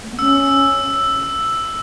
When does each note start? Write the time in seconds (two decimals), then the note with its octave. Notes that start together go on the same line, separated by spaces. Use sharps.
0.03 A3
0.11 B3
0.19 C#4 E6